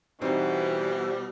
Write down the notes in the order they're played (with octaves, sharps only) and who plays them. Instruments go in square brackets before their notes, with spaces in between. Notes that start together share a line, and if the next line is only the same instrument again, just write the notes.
[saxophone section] B2 G3 [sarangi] E3 [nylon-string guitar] C4 D#4 F#4 [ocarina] C5